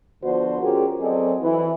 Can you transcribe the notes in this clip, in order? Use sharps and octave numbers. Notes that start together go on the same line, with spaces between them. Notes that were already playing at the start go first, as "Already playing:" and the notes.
D3 F3 B3 F#4 C5 D5
C#4 F4 G4 G#4 A#4 C5
F#3 C4 G#4 A4 D5 D#5
E3